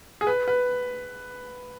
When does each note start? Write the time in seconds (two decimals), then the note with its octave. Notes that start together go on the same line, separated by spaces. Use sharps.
0.21 G#4
0.27 B4
0.48 B4